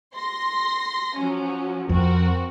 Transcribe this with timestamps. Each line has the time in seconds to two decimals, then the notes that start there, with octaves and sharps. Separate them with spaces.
0.15 C6 A#6
1.16 F3 F#3 C#4
1.89 F2 C4 F#4 A#4